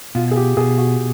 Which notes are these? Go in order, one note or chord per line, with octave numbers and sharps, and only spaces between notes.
B2 F4
G#4
G4
B2 G#4
F#4